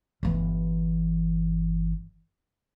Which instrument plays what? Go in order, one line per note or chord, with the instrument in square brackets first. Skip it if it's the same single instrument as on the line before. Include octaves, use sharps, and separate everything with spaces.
[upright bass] G1 E3